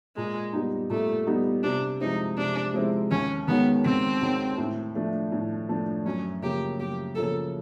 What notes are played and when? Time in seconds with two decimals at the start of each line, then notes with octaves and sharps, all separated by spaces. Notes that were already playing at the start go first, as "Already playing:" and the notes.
0.16 A#2 G#3
0.53 G3 B3 D#4
0.90 A#2 A3
1.27 G3 B3 D#4
1.63 C3 D4
2.00 F3 G#3 C4 D#4 E4
2.37 C3 D4
2.74 F3 G#3 C4 E4
3.11 D#2 C#4
3.48 D#3 G#3 B3 C#4 F#4
3.85 D#2 C4
4.21 D#3 G#3 C#4 F#4
4.58 A2
4.95 F3 A3 D4
5.32 A2
5.69 F3 A3 D4
6.06 F#2 C#4
6.42 C#3 F3 A#3 G4
6.79 F#2 G4
7.15 C#3 F3 A#3 A4